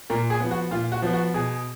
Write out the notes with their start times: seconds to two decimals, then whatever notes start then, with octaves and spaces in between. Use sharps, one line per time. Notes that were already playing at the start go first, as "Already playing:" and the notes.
0.10 A#2 A#4
0.30 G#4
0.40 F3 B3
0.51 F#4
0.71 A#2 F4
0.92 F#4
1.02 F3 B3
1.13 F#4
1.34 B2 G#4